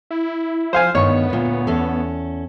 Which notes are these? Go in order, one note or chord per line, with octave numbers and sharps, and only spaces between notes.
E4
F3 C5 F5 G#5
D2 G2 D#3 B3 C#5 C#6
D2 A#2
E2 C#4 A4